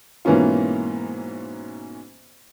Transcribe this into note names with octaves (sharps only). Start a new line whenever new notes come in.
G#2 B2 E3 A#3 C#4 F4